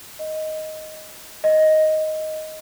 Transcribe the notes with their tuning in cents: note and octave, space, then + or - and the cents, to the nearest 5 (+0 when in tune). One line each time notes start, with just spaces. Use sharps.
D#5 +5
D#5 +5